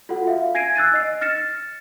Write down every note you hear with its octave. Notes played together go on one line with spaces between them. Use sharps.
F4 F#4 A4 F#5
E5 F5
G#5 G#6 A#6 C7 D7 D#7
E6 F#6 A6 D#7
D#5 C7
F6 A6 A#6 C#7 E7